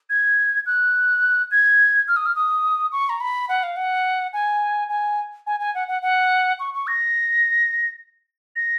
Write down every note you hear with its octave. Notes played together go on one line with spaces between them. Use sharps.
G#6
F#6
G#6
F6
D#6
F6
D#6
C#6
A#5
B5
F#5
F5
F#5
G#5
G#5
G#5
G#5
F#5
F#5
F#5
C#6
C#6
A#6
A#6